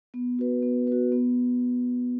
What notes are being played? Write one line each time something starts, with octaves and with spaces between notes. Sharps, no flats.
B3
F#4 B4
B3
F#4 B4
B3